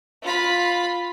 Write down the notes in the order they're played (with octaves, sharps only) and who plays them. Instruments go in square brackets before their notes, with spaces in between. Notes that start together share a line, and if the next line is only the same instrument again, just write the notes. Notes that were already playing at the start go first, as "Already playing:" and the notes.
[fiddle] F4 B5